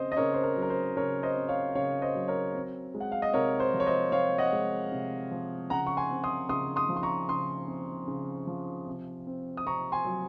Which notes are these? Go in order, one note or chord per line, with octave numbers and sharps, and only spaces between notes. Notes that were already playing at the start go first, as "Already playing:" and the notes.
Already playing: C#3 C4 C5 D#5
D#5
C#3 A#4 C#5
C5
A#4
F#3
A#4
C5
C#3 A#4 C#5
C5 D#5
C4
C#5 F5
C#3 C#5 F5
C5 D#5
F#3
A#4 C#5
C4
G#3
F#5
F5
D#5
C3 A#4 C#5
C5
F3
C#5
C5 D#5
C4 C#5 F5
D#5 F#5
G#3
C3
F3
C#3 F#5 A#5
C#6
G#5 C6
C4
C6 D#6
C#3 C6 D#6
C6 D#6
F3
C6
A#5 C#6
C#3 C6 D#6
C4
C#3
F3
C3
C4
D#6
C3 A#5 C#6
G#5 C6
F#3